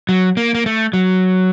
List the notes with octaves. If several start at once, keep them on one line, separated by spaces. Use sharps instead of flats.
F#3
A#3
A#3
A3
F#3